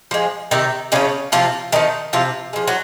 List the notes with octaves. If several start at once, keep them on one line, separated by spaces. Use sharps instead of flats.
F3 G#3
C3 D#3 D#4
C#3 F3 G#3 C#4
C3 F3 F4
D#3 F3 G#3 D#4
C3 F3 F4
F3 G#3
F#3 F#4